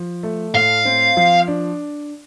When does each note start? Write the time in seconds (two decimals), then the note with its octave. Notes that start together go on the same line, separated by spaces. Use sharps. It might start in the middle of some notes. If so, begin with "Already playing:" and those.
Already playing: F3
0.23 A3
0.54 A2 F5
0.85 C4
1.17 F3
1.48 D4